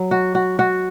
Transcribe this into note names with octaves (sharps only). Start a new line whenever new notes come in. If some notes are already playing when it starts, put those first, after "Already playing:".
Already playing: F#3
F#4
F#4
F#4